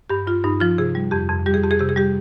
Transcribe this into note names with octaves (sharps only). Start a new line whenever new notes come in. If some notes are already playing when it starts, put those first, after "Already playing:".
G2 G4
G2 F4
G2 D#4
F3 F4
C3 G#4
G3
F2 G4
F2
G3 G4
G#4
F2 G4
G#4
C3 G4
G#4
G3 G4